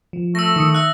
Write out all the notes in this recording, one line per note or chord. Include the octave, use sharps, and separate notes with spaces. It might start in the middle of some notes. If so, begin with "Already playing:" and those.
F3
A3 E6 A#6
D#3 D#6 C#7
E5 E6 F#6